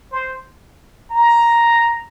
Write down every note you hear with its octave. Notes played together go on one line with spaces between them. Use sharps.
C5
A#5